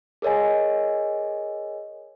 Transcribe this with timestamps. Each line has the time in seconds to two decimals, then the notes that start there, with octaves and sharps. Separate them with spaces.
0.22 G#4 A#4 C#5 D#5 G#5